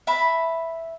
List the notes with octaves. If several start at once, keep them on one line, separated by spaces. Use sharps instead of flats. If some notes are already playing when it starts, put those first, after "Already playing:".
E5 A5 B5